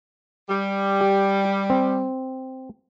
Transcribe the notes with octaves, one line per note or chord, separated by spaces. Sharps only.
G3
G4
C4